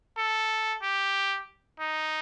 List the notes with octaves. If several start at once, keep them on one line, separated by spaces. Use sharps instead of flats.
A4
G4
D#4